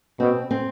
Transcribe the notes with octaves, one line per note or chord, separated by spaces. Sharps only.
B2 C4
C4